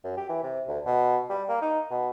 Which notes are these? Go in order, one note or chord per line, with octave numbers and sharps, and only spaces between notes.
F#2
G4
E3
C3
D2
B2
G3
A#3
D#4
B2